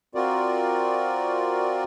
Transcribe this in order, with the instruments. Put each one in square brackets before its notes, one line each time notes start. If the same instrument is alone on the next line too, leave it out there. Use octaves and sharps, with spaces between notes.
[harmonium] C4 F4 F#4 A#4 D5